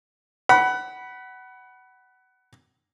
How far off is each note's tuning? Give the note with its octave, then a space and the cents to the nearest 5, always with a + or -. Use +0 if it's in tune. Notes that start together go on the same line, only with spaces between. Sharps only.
F#5 +20 B5 -10